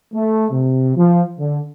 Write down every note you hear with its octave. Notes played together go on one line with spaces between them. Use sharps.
A3
C3
F3
D3